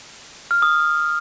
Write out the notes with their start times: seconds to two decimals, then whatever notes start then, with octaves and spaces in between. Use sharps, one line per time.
0.51 F6
0.62 D#6